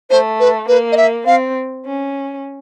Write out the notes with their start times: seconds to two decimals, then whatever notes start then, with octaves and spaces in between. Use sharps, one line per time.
0.10 A3 C5
0.40 B4
0.68 A#3 B4
0.92 D#5
0.97 E5
1.26 C4 F5
1.85 C#4